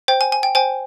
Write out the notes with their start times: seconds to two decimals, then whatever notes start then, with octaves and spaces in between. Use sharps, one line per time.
0.08 C5 G5
0.21 G#5
0.32 G#5
0.43 G5
0.55 C5 G5 G#5